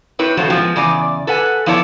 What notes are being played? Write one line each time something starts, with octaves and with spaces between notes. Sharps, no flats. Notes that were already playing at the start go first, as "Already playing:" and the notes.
C4 E4 B4 C#5
A2 C#3 F#3 A3 C5
F3 G#3 B3 C4
E2 C#3 D5 G#5
A4 B4 F#5 G#5
F3 B3 E4 C#5 D5 A5